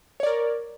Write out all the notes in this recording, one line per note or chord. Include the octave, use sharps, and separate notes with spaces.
A#4 C#5 D5